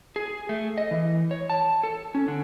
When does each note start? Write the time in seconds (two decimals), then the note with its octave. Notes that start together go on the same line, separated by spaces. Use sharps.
0.16 G#4
0.49 A3
0.78 D#5
0.91 E3
1.31 C#5
1.50 A5
1.83 A4
2.15 C#4
2.28 D3